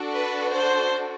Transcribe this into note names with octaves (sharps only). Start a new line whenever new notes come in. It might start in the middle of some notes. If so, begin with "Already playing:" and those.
Already playing: D4 F#4 A4
B4
C5